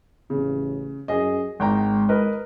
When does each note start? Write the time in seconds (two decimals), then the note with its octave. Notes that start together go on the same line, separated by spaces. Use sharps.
0.30 A1 C#3
1.08 F#2 G#4 D#5
1.60 G#1 G#3 G5 A#5
2.09 A#4 B4 D#5